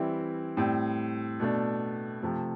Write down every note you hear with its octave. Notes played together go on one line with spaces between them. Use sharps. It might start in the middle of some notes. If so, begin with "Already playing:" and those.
Already playing: E3 G3 C4 E4
A2 G3 C4
B2 A3 D4
C3 F3 A3